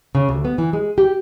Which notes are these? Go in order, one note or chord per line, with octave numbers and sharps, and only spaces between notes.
C#3
D2
B3
E3
G#3
G4